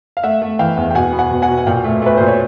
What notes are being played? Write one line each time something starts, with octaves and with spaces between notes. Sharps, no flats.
F5
A3 E5 F#5
A3
E3 F5 G5
E2
G5
B2 F#5 G#5
B3
F#5 G#5
B2
F#5 G#5
B2
G#5
A#2 F5 G5
A3
A3 B4
A#2 C5
C#5